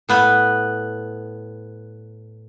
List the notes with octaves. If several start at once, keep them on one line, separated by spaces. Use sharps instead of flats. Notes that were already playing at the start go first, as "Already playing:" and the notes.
A2 B3 B4